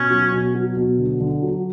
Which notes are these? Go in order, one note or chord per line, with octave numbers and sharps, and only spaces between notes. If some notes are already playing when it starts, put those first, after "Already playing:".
Already playing: B2 C#4
F#3
B2
F#3
B2
D3
D3
F#3